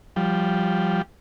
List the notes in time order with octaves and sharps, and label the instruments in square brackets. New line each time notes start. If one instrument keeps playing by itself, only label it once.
[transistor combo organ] F3 G3